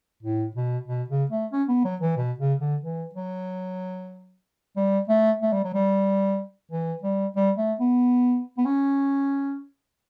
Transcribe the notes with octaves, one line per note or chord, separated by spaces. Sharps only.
A2
B2
B2
C#3
A3
C#4
B3
F#3
E3
B2
C#3
D3
E3
F#3
G3
A3
A3
G3
F#3
G3
E3
G3
G3
A3
B3
B3
C#4